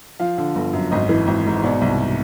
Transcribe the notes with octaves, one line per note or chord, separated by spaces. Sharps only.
F3 F5
D3
G1
F#2
G#1 D#5
E3
G#1
G#2
B2 D5
C2